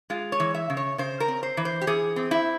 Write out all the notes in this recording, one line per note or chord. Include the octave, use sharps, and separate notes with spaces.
G#3 F4
C#5
E3
E5
C#3
C#5
C#3 C5
A#4
C4
C5
E3
C5
G4
E3 G#4
C4
E4